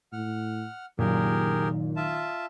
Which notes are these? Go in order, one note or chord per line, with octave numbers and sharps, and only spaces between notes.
A2 F#5 F6
F#1 A#2 D#3 G4 G#4 A#4
F4 E5 A5